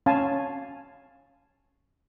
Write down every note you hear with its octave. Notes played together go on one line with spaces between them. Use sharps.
C#4 F5 G#5 A5